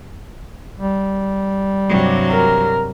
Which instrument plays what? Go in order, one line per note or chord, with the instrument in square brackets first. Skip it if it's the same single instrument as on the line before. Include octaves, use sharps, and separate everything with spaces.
[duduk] G3
[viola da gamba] G2 C3 F#3
[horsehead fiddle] A#4